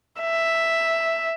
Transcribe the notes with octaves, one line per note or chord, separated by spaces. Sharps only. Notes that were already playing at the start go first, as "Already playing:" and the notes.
E5